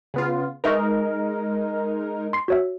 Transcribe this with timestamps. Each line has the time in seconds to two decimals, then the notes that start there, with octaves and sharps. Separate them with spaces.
0.14 C#3 B3 F4
0.64 G#3 D#4 A#4 B4 E5 C#6
2.33 C6 C7
2.48 F#4 C#5 E5